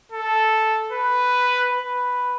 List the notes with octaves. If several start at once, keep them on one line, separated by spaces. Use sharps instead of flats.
A4
B4
B4